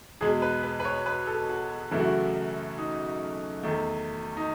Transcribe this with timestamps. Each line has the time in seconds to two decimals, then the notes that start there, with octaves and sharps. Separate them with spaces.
0.21 E2 B2 G#3 G#4
0.42 B4
0.63 B4
0.80 B4
0.85 C#5
1.06 B4
1.27 A4
1.49 F#4
1.91 F#2 C#3 E3 A3 E4
1.99 F#4
2.06 E4
2.78 D#4
3.63 E2 D#3 A3
4.37 D#4